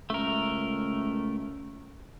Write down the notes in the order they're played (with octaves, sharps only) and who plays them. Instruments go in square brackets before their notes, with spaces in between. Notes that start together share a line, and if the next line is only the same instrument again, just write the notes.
[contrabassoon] C#2 [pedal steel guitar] A3 A#4